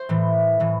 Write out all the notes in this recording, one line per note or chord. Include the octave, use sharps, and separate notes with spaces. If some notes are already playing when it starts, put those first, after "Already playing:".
Already playing: C5
A2 E3
A2 E3